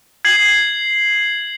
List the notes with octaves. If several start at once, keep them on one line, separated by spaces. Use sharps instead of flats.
G#6 C7 F#7